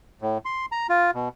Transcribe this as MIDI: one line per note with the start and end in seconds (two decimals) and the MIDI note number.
0.22 0.38 45
0.45 0.66 84
0.72 0.87 82
0.89 1.11 65
1.15 1.29 47